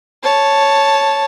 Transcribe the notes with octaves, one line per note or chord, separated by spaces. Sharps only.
C#5 A5